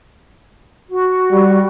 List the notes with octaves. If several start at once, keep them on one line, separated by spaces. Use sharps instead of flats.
F#4
G3